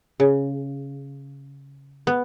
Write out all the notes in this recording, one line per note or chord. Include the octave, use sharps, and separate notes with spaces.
C#3
B3